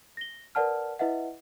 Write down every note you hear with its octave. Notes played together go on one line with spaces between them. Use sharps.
A#6 G7
A#4 B4 D5 F#5 A5 F6
E4 B4 D#5 E5 F#5